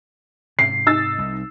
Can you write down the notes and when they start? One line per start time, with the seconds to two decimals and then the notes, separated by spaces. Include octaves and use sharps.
0.59 G#2 C3 C7
0.86 D#4 E6 A6
1.18 C2